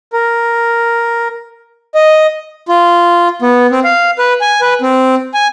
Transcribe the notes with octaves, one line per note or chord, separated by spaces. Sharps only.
A#4
D#5
F4
B3
C4
F5
B4
G#5
B4
C4
G#5